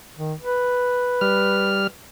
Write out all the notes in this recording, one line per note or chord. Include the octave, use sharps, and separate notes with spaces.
D#3
B4
G3 F6